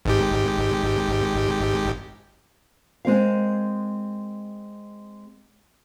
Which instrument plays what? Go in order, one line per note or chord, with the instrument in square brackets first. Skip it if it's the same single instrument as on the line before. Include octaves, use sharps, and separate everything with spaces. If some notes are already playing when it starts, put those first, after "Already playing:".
[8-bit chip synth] G#1 G#2 G4
[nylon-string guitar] G#3 C4 A#4 F5